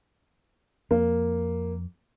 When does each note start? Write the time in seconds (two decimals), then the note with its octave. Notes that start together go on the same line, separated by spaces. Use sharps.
0.91 F2 A#3